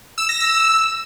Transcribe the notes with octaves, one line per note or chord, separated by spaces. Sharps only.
E6
A#6
E6